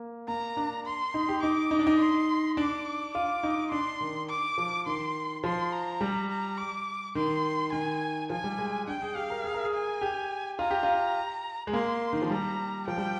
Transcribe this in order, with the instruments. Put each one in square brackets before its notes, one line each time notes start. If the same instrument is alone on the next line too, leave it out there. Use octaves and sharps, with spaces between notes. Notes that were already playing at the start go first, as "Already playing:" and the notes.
Already playing: [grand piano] A#3
[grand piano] A#3 [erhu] A#5
[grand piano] D4
[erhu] C6
[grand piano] D#4
G4
[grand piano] D#4 [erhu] D6
[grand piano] D#4
D4
D#4
[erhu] C6
[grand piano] D4 [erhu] D6
[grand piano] F4 [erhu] D6
[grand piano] D#4
[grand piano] D4 [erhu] C6
[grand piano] D#3
[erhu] D6
[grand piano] F3
[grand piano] D#3 [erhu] C6
[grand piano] F3 [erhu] C6
[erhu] A#5
[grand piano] G3
[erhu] A#5
D6
[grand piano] D#3 [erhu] C6
[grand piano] D#3 [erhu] G#5
[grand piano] F3 [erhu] G#5
[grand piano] G3
G#3
[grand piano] D4 [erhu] G5
[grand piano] G#4
[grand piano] G4 [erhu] F5
[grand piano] A#4
G#4
A#4
G#4
[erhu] G#5
[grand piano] G4
[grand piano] F4 [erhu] A#5
[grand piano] G4
F4
G#3
[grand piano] A#3 [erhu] C6
[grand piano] D#3
F3
[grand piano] G3 [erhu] A#5
[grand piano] F3 [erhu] G5
[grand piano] G3